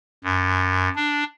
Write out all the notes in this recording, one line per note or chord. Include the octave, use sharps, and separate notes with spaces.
F#2
D4